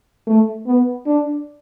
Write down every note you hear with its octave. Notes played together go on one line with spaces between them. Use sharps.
A3
B3
D4